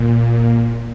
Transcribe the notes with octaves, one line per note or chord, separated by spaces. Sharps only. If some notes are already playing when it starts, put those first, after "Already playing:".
Already playing: A#2